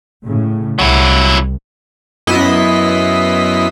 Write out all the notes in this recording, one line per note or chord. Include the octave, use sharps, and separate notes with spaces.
A2 C#3
C2 F#3 E4
F#2 B3 E4 D#5 C6 B6